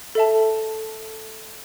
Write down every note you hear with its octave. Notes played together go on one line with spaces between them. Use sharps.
A4 E5 A5